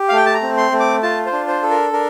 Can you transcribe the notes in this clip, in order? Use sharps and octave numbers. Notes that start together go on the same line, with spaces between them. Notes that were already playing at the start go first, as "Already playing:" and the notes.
Already playing: G4
F5
A3 G5
A5
A#5
C4
C6
A3
D6
F4 A5
C5
D4
C5
A4
A#4
D4 A#4